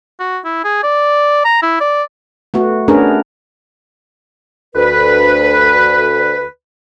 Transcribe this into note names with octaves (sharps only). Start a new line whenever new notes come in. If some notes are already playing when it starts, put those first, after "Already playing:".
F#4
E4
G#4
D5
A#5
E4
D5
A3 B3 F#4
A3 B3 C#4 D4 G#4 A#4
D2 B4